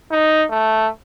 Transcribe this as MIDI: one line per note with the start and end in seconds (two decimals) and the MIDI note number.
0.11 0.44 63
0.50 0.88 57